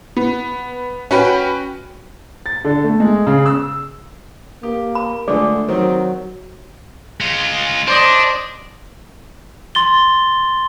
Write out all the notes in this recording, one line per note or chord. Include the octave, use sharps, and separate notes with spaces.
B3
C#4 F#4 B4 G5
A6
D3
A3
G#3
C#3
E6
A#3 G4
B5
D3 F3 G#3 A3 G#4 D5
D#3 F#3 C4
G#3 F4
D4 C5 D5 D#5
C6 A6 G7